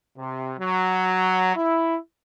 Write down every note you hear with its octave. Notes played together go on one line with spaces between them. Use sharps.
C3
F#3
E4